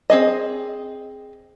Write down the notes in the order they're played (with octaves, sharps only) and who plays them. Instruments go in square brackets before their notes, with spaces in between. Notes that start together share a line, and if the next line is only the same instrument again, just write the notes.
[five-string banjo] C4 G#4 D#5